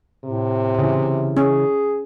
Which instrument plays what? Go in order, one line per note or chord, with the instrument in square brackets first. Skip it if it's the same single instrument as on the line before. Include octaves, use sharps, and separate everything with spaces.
[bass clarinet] A2 [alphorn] C3
[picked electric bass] C#3 E3
[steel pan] C#4 [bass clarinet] G#4